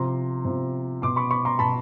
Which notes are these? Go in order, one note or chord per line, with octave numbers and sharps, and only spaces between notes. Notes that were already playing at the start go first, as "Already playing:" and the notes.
Already playing: C3 F3 A#5 C6
C3 F3
B2 C6 D6
B5 C#6
B5 C#6
A#5 C6
B2 A5 B5